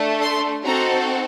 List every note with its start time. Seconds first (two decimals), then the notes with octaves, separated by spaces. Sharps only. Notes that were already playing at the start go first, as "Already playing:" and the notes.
Already playing: A3 D4 A4
0.22 C6
0.65 C4 D#4 F#4 A4 A#5